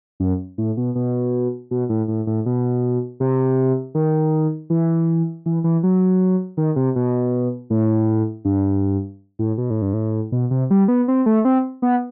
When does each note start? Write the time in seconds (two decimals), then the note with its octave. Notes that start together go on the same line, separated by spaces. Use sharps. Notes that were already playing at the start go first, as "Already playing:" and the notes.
0.20 F#2
0.58 A2
0.77 B2
0.95 B2
1.71 B2
1.89 A2
2.08 A2
2.27 A2
2.46 B2
3.20 C3
3.95 D#3
4.70 E3
5.46 E3
5.64 E3
5.83 F#3
6.57 D#3
6.76 C3
6.96 B2
7.70 A2
8.45 G2
9.39 A2
9.58 B2
9.70 A2
9.82 G2
9.93 A2
10.32 B2
10.51 C3
10.70 G3
10.88 B3
11.08 C4
11.26 A3
11.45 C4
11.82 B3